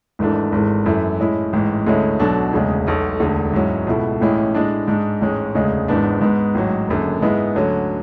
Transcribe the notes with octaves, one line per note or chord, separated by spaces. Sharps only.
G#1 G#2 E3 A3 D4
G#1 G#2 E3 A3
F#2 E3 A3 E4
A2 G#3 C#4 E4
A1 G#2 E3
D2 D3 G#3 C#4 E4
B1 B2 F#3 A3 D4
E1 D2 C#3 G#3
B1 B2 A3
E1 D2 D3 A3
G#2 F#3 C#4 E4
C#2 B2 A3 E4
A1 A2 G#3 C#4 E4
A2 G#3 D4
G#2 G#3 D4
A1 G#2 G#3 C#4
E1 D2 C#3 G#3
G#1 G#2 E3 B3 D4
G#2 G#3 B3
A1 G#2 F#3
F#1 F#2 D3
G#2 G#3 B3 E4
D2 D3 F#3 C#4